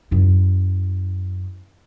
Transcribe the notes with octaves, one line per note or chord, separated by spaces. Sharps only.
F#2 E4